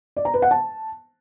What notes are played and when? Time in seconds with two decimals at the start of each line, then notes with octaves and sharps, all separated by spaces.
0.17 D5
0.25 A#5
0.34 B4
0.42 F#5
0.51 A5